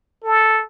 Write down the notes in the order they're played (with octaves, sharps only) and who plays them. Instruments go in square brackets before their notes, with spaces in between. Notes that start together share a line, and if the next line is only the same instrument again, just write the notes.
[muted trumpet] A4